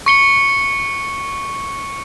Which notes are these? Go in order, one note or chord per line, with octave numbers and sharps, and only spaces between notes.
C#6 C#7 G7